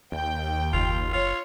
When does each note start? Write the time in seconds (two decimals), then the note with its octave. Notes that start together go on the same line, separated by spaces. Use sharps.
0.12 D#2 G5
0.73 F#1 F4
1.14 F4 C#5